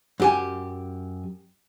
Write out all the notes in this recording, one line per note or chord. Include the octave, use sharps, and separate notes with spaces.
F#2 G4 G#5